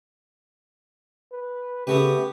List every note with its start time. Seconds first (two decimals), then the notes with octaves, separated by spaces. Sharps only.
1.32 B4
1.87 C#3 A3 B3 F#4 G4 B4